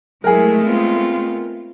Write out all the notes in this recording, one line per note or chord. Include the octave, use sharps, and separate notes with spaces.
F#3 G#3 A3 E4 G#4 A#4
B3 C4 F4